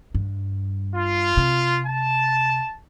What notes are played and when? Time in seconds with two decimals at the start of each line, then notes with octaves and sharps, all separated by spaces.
0.15 G2
0.93 F4
1.37 C3
1.85 A5